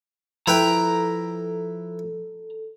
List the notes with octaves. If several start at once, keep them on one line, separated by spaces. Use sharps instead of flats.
F3 E4 A4 B4 G5 A#5